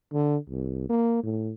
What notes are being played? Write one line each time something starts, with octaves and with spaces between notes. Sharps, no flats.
D3
C2
A#3
A2